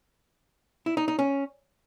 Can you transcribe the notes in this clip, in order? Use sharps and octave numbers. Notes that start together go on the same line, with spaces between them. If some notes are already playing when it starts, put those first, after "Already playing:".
E4
D#4
D#4
C#4